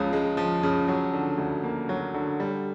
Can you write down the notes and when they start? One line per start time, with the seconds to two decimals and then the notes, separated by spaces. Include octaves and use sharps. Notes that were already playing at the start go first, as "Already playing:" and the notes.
Already playing: C#2 C#3 F3
0.13 G#3
0.37 F3
0.63 C#3
0.88 F#3
1.13 D3
1.38 D2
1.64 A#3
1.89 F#3
2.14 D3
2.40 G3